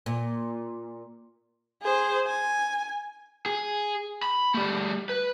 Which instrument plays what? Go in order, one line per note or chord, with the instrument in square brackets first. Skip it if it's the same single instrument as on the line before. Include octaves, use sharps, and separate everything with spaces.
[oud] A#2
[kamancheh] G#4 C5
G#5
[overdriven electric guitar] G#4
B5
G3 A3
B4